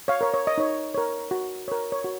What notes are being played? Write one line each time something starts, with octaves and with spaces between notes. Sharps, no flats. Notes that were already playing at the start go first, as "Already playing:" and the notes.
C#5 F5
A#4 C#5
C#5
D#5
D#4 C#5
A#4 C#5
F#4
A#4 C#5
C#5
F#4